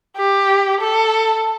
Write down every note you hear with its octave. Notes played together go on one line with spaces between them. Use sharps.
G4
A4